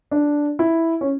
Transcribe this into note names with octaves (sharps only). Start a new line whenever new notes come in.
D4
E4
C#4